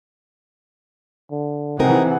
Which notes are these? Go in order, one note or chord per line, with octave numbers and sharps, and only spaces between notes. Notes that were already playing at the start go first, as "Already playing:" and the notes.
D3
C3 E3 C4 D#4 G#4 A#4 F#5